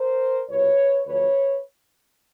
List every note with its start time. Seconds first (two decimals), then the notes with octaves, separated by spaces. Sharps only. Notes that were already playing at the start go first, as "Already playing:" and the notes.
Already playing: A#4 C5
0.49 C2 B2 B4 C#5
1.06 D2 D3 F3 B4 C#5